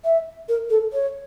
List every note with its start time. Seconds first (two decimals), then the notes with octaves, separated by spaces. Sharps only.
0.04 E5
0.49 A#4
0.70 A4
0.93 C#5